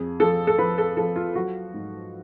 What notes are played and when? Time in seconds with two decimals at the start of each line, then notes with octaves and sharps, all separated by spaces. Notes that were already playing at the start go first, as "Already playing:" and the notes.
Already playing: F2 G#4
0.20 F3 A4
0.47 A4
0.58 F3 B4
0.78 A4
0.97 F3 A4
1.16 F4
1.35 F#3 F#4
1.74 G#2